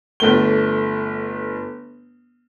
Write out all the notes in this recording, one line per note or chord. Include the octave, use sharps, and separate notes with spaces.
G1 A3 G7